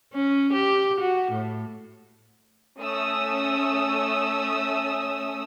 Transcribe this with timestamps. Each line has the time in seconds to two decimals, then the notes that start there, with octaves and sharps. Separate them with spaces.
0.13 C#4
0.53 G4
1.00 F#4
1.31 A2
2.79 A3 C#4 D#6 E6